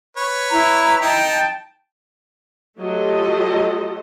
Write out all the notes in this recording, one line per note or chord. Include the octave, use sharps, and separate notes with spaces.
B4 C#5
E4 A#5
D#4 G5 A5
F#3 A3 F4 G4 A4 D#5